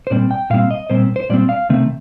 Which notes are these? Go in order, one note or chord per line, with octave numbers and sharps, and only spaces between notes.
C5
A#2 G3 C4 D5
G5
A#2 G3 C4 F5
D#5
A#2 G3 C4 C5
C5
A#2 G3 C4 D5
F5
C3 D#3 A3 C4